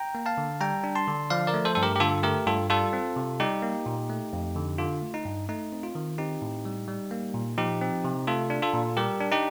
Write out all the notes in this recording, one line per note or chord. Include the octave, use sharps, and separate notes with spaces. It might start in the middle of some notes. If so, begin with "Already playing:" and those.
Already playing: G5 A#5
A#3
F5 A5
D3
G3 G5 A#5
D4
A5 C6
D3
F3 D5 F5
A#4 D5
A3
A4 C5
G2 A4
G4 A#4
G4
D3 F4 A4
A3 G4 A#4
G2 F4 A4
G3 F4 A4
C4
C3
G3 D#4 G4
A#3
A#2
A3
F2
D3
D3 F4
A3
D#4
G2
A3 D#4
C4
F4
D#3
C4 D#4 G4
A2
G3
G3
A#3
A#2
F3 D#4 G4
C4
C3
A3 F4 A4
D4
F4 A4
A#2
G3 G4 A#4
D4
D#4 G4